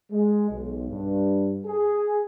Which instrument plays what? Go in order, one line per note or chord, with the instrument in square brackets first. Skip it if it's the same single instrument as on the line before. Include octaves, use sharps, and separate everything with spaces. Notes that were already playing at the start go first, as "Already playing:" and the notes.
[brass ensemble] G#3
B1
G2
G#4